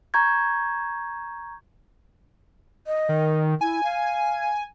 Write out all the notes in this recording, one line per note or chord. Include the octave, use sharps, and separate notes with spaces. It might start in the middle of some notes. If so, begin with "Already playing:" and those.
A#5 C#6 G6 G#6
D#5
D#3
E4 G#5
F5